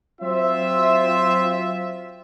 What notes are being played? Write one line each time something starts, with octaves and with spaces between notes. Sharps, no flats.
F#3 C4 F4 C5 E5